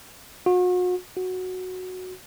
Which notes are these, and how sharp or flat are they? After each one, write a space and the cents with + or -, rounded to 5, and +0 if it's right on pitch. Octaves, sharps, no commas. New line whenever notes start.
F#4 -40
F#4 -5